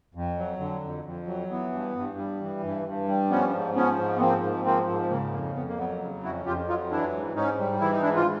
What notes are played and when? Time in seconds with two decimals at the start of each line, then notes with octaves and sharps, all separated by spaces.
0.15 F2
0.38 F#3
0.60 D3
0.82 F2
1.05 F2
1.27 F#3
1.50 E3 B3
1.72 G2
1.96 G2
2.18 G3
2.41 E3
2.63 G2
2.86 G2
3.08 G3
3.30 F3 B3 C#4
3.53 G#2
3.75 F3 B3 C#4
3.98 G#2
4.16 B3
4.20 F3 A#3 C4
4.43 G#2
4.65 F3 A#3 C4
4.89 G#2
5.11 C#3 A#3
5.33 F2 A#3
5.55 F2 B3
5.68 A#3
5.78 F#3 B3
6.01 C#3
6.23 F2 E4 F#4
6.45 F2 F4 G4
6.68 F#3 D#4 F4
6.91 E3 D4 E4
7.13 G#2
7.35 G#2 C#4 D#4
7.58 G3
7.81 E3 E4
7.91 D#4
8.02 G#2 D4 E4
8.16 F4